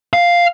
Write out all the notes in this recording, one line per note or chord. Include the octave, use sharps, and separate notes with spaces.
F5